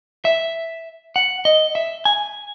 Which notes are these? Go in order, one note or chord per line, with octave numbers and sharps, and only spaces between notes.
E5
F#5
D#5
E5
G#5